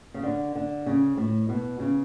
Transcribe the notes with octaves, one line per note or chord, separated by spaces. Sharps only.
C#3
D3
D3
C#3
A2
B2
C#3